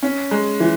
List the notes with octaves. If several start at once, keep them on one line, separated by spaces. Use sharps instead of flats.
C#4
G#3
E3